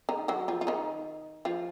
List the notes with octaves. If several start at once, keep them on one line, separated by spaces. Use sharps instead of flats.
D#3 D#4
F#3 F#4
F3 F4
F4
D#3 D#4
F3 F4